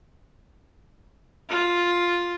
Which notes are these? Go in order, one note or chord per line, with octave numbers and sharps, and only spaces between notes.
F4